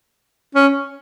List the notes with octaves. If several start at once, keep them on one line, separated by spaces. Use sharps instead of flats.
C#4